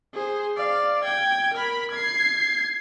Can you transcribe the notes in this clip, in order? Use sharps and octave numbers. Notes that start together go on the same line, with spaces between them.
G#4 C5
D5 F5
G5 G#6
A#4 B5
G#6 C7